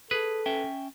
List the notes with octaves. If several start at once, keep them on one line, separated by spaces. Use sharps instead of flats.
G#4 A4 B4
C#4 E5 G5